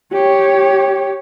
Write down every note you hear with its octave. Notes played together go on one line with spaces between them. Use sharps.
G4 C#5